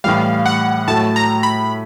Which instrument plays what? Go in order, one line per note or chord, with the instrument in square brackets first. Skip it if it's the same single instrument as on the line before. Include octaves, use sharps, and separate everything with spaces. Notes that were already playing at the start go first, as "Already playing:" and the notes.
[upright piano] A2 E3 G3 [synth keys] F5
[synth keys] F#5
[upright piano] A2 F#3 A3 [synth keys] A5
[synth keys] A#5
B5